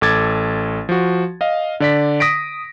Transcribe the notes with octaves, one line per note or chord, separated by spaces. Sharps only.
A1 A4 D6 G#6 A6
F3 F#4
D#5 F5
D3 D5 B6
D#6 A#6 B6 D7